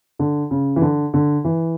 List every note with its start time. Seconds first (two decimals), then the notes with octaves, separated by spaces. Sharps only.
0.19 D3
0.51 C#3
0.76 E3
0.82 D3
1.14 D3
1.45 E3